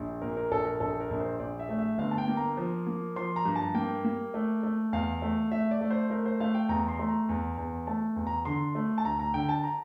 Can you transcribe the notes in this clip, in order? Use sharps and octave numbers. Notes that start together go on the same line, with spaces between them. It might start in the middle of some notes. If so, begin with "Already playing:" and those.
Already playing: A#1
A#2 A#4
A#4
A#1 A4
A#4
A#1 A4
A#4
A#1
C5
A#1 D5
E5
A3
E5
G1 F5
A5
G5
A#3
A#5
F3
A#3
F3 C6
A#5
G2
A5
A#3 G5
A#3
A3
A3
E2 F5
A3
A3 E5
D5
A3
C5
A3 A#4
C5
A3 F5
G5
E2 A#5
C6
A3
A#5
E2
E2
A3 A5
E2
A#5
D3 C6
A3
A5
D2 A#5
A#5
D3 G5
A5
A#5